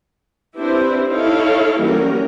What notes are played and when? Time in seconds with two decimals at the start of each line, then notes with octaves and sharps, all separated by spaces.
0.57 C4 D4 E4 G4 B4 C5
1.10 D#4 E4 A4 C#5 F5
1.81 E3 F#3 G3 A#3 C#4 A#4